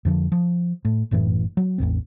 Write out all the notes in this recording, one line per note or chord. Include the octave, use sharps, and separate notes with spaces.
F2 D3 F3
F3
A2
G1 F#2 A2 E3
F#3
A1 E2 G2 C4